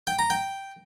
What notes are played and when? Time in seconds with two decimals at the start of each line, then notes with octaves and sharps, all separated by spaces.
0.07 G5
0.19 A#5
0.30 G5